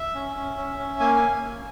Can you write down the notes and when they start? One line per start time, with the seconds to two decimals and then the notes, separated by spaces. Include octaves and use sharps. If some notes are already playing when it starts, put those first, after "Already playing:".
Already playing: E5
0.15 C#4
0.36 C#4
0.57 C#4
0.78 C#4
1.00 A#3 G#5
1.16 G#5